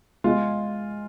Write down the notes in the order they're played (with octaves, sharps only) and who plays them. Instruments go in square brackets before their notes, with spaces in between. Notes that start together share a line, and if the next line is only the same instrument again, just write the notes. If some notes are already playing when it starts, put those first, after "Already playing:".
[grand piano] G#3 F4